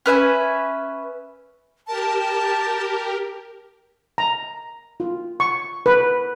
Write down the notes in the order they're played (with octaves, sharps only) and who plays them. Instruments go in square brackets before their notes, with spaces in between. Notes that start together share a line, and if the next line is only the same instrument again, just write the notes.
[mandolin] C#4 B4 E5 G#5
[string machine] G4 A#4 [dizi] A5
[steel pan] A#5
F4
C#6
B4